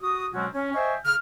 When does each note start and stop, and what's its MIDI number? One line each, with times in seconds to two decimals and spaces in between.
0.01 0.27 66
0.01 0.27 87
0.34 0.46 47
0.34 0.46 54
0.34 0.46 56
0.34 0.46 60
0.34 0.46 61
0.34 0.46 66
0.55 0.71 61
0.75 0.94 72
0.75 0.94 75
0.75 0.94 76
0.75 0.94 79
0.75 0.94 80
0.75 0.94 85
1.04 1.14 49
1.04 1.14 89